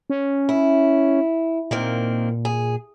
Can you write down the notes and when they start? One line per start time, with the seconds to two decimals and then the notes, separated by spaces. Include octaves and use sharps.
0.10 C#4
0.49 E4
1.71 A#2 D#3 A#3 C4
2.45 G#4